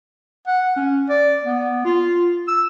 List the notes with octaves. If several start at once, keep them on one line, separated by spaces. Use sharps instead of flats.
F#5
C#4
D5
B3
F4
E6